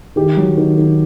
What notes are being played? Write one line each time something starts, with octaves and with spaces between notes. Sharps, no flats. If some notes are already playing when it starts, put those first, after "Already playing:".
D#3 G4
F#3
D#3
D#3